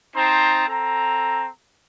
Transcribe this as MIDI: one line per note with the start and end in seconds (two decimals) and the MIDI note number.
0.15 0.67 60
0.15 0.67 63
0.15 0.67 72
0.15 0.67 81
0.15 0.67 82
0.67 1.48 60
0.67 1.48 69
0.67 1.48 82